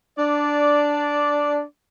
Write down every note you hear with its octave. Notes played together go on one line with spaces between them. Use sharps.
D4 D5